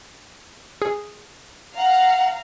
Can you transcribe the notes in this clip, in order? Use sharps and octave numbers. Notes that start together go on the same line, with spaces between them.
G#4
F5 F#5 A#5